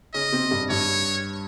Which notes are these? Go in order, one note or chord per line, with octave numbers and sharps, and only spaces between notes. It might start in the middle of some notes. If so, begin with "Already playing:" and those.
C#3 C#4 D#5
C3 C4
G2 G3
G2 G3 C#5